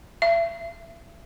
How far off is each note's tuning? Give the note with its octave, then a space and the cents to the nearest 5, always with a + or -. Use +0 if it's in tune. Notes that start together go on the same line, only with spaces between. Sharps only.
E5 +35